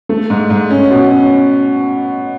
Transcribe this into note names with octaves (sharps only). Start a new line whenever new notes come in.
A3
G#2
G#2
C#4
B2
C#4